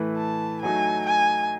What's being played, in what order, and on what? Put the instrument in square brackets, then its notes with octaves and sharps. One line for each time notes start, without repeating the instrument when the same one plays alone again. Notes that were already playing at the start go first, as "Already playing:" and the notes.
Already playing: [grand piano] A2 E3 A3 E4 B4
[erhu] A5
[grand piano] F#3 A3 D#4 [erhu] G#5
[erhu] G#5